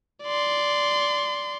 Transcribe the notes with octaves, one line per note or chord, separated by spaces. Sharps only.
D5 C6